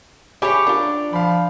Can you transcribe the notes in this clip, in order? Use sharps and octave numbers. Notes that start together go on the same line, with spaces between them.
G3 G4 G#4 C#5 E5 B5 D6
D4 F4 A#4
F3 F5 B5